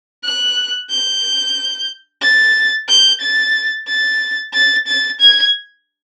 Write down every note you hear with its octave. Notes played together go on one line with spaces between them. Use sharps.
F#6
G6
A6
G6
A6
A6
A6
A6
G#6